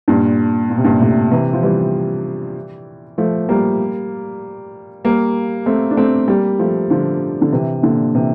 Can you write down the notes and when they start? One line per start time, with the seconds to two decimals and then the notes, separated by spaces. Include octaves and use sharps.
0.08 G2 A#2
0.70 A#2
0.78 C3
0.84 G2 A#2
1.00 A2 C3
1.31 C3 E3
1.53 F3
1.63 E3 G3
3.18 F3 A3
3.49 G3 A#3
5.04 G3 A#3
5.66 A3 C4
5.91 D4
5.97 A3 C4
6.28 G3 A#3
6.59 F3 A3
6.90 D3 F3
7.42 D3
7.52 C3 E3
7.83 A#2 D3
8.15 C3 E3